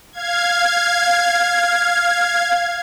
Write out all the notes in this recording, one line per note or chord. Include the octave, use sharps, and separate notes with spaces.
F5 G#6